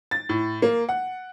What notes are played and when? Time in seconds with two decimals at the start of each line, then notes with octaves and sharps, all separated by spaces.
0.11 A6
0.29 A2
0.62 A#3
0.89 F#5